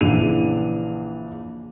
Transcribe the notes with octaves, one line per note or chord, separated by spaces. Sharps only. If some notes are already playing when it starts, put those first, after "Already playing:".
A#1 C#3 E3 D4 D#7 F7